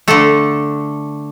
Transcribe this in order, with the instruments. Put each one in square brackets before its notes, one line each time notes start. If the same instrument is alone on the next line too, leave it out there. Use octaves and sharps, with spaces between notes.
[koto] D3 A3 A4